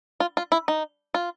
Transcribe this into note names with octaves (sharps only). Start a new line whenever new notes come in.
F4
F4
E4
D#4
F4